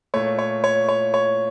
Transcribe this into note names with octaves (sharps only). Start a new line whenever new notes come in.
A#2 A3 C#5
C#5
C#5
C#5
C#5